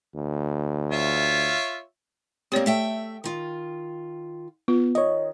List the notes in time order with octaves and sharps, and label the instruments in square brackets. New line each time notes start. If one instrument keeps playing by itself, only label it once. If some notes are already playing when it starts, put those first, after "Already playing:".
[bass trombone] D2
[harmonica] F4 C#5 E5
[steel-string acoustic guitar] A#3 C4 [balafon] G4 C#5 D5
[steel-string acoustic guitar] A3 E5 G5
D#3 F4
[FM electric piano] B3 [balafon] F4
[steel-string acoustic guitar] D#3 [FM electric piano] C#5 D#5